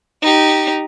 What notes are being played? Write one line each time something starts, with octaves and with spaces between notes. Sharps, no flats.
D#4 G4